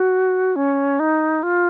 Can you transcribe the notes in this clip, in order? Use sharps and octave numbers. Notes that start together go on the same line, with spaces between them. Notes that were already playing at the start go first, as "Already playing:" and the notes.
Already playing: F#4
C#4
D#4
F4